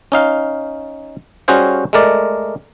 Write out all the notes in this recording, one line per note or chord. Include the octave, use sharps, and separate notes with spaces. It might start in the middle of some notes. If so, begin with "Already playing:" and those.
C#4 D#4 F5
G3 C#4 F#4 G#4 C5 F5
G#3 A3 A#4 D5